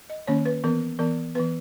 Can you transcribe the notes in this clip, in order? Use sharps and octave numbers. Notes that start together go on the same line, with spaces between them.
D#5
D#3 A#3 C#4 C#5
B4
E3 B3 A#4
E3 B3 A#4
E3 B3 B4